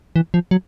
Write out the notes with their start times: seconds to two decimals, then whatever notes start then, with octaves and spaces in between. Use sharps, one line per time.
0.16 E3
0.34 F3
0.51 F#3